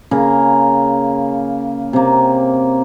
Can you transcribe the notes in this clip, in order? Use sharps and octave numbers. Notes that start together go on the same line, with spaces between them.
C#3 A#3 A#4
C3 A#3